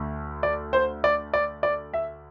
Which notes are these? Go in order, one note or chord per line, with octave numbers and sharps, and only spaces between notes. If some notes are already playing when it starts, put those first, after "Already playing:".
Already playing: D2 D3 A3
D5
C5
D5
D5
D5
E5